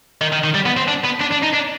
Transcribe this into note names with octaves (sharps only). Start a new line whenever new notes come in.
D#3
D#3
D#3
G3
B3
C4
D4
B3
D4
D4
D#4
D4